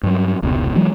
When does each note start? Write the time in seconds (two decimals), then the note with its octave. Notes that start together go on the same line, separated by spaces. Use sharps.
0.03 G2 F#3
0.42 F1 C#2 G#2 B2
0.75 E3 F#3 G#3